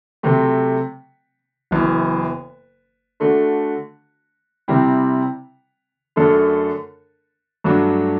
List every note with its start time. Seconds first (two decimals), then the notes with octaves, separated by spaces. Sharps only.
0.23 C3 F#3 A3 C4
1.71 F#1 F#2 E3 B3
3.20 D3 A3 D4 F#4
4.68 C3 G3 C4 E4
6.16 F#2 D3 A3 D4 A4
7.64 G2 F#3 A3 D4 F#4